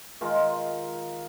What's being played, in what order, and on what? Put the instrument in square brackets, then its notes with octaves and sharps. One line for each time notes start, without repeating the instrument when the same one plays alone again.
[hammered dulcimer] D#3 G#3 F4